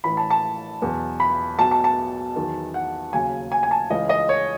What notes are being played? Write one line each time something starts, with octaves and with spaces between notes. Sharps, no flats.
A1 A2 E3 B5
A5
A5
E2 B2 F#3
B5
B1 B2 F#3 A5
A5
A5
E2 D#3 F#3
F#5
D#2 C#3 F#3 G#5
G#5
G#5
A5
C#2 C#3 E3 D#5
D#5
C#5